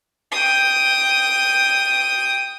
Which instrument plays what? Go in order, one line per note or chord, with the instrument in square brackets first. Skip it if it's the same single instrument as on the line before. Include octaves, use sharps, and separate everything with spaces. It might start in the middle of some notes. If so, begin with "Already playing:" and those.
[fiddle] G5 D#6